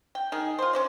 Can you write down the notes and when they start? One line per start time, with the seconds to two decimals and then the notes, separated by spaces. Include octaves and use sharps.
0.15 G5
0.32 D#3 G#4
0.59 F4 C5
0.73 C#4 C5 D5